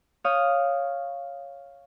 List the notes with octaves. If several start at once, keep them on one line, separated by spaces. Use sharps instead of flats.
C#5 F5 D#6 G6